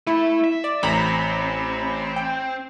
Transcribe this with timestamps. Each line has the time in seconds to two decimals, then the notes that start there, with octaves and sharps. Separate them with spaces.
0.07 A3 E4 A4
0.44 E5
0.64 D5
0.83 A1 C4 A#5 B5
2.16 G5